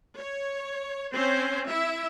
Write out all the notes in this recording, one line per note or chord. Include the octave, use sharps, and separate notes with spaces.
C#5
C4 C#4 C5
E4 E5